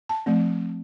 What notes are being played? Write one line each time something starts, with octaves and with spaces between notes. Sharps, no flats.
A5
F3 A3 C4